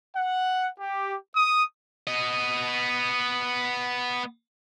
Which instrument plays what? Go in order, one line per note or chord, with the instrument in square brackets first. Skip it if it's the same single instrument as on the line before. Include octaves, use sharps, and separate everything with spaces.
[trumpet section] F#5
G4
D#6
[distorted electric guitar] B3 D#5